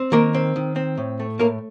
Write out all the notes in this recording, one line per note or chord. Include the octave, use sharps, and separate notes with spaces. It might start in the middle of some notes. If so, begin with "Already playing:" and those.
Already playing: C4
D#3 A#3 A#4
C4
D#3
C4
A2
A3
A2 A#3 A#4